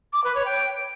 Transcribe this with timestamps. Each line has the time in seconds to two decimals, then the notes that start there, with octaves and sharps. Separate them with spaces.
0.13 D6
0.24 B4
0.34 C#5
0.45 G5